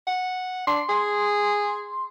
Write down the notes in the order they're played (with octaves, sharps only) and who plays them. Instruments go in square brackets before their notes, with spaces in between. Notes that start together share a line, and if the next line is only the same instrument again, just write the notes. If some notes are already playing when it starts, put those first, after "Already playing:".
[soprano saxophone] F#5
[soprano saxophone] D4 [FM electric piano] C6
[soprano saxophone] G#4